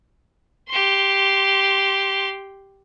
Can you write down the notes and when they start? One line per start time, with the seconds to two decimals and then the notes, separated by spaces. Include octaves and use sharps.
0.69 G4 C6